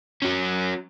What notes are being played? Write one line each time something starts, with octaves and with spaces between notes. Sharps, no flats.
F#3 C#4